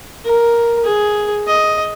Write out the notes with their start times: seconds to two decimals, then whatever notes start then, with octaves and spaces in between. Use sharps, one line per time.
0.25 A#4
0.84 G#4
1.47 D#5